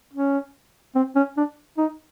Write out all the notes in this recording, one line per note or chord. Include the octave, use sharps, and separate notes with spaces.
C#4
C4
C#4
D4
D#4